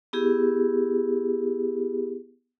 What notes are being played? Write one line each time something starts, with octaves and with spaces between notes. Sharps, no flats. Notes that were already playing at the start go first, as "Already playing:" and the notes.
B3 E4 G4 G#4